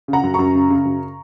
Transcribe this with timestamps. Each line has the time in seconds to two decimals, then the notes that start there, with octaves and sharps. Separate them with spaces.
0.08 C#3
0.13 F#5 A#5
0.23 F#2
0.34 F#2 A#5 C#6
0.55 C#3
0.70 C#3
0.85 F#2